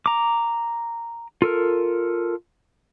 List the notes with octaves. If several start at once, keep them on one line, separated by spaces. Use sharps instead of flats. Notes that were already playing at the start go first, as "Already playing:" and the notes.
A#5 D6
F4 A4 A#4